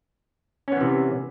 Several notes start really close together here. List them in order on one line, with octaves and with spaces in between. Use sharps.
C#4 B3 E3 C3